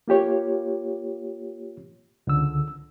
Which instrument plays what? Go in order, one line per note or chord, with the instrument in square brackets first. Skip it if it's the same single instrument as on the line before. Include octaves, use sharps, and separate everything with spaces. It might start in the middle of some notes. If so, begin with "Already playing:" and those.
[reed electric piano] A#3 F4 G4 C#5
C#2 D3 E6